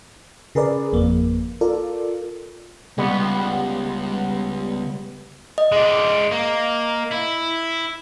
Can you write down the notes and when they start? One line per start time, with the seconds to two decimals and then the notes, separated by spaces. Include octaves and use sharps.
0.55 C#3 G#4 A#4 B4 D5
0.92 G#1 F2 A#3
1.61 F4 A4 A#4 D5
2.98 C#2 G3 B3
5.58 D#5
5.72 G#3 D5
6.31 A#3
7.12 E4